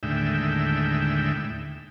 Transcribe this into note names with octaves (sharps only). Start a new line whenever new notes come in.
D#2 A2 D3 G#3 E5 G5